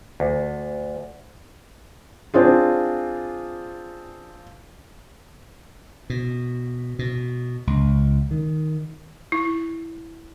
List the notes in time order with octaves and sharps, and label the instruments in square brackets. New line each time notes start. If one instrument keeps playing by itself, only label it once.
[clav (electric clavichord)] D2
[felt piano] C4 D4 F4 G#4
[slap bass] B2
B2
C#2
D#3
[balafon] E4